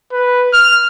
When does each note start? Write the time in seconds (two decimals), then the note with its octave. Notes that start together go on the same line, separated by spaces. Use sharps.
0.12 B4
0.53 F6